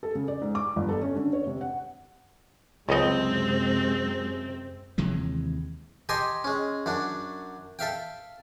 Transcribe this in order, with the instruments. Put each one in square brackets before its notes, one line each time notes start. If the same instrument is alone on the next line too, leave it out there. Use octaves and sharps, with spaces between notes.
[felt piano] A4
C#3
D5
G#2
D6
G1
A4
C#4
D3
C#5
C3
F#5
[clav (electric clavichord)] C#2 D#5 [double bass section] F#2 C3 G#3 [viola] C4
[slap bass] D#2 C3 E3 G#3
[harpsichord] G4 A4 D#5 G5 G#5 C6
G#3 C#4
F#2 F#3 D4
A4 E5 F5 G5